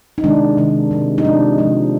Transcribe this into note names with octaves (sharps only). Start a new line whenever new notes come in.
D#4
C3 D#3 G#3 D4
C3 D#3 G#3
C3 F3 G#3
D#4
C3 F3 G#3 D4
C3 F3 G#3